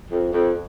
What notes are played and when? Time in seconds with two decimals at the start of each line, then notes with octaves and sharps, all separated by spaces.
0.10 F2
0.32 F2